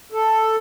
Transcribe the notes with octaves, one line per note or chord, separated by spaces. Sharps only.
A4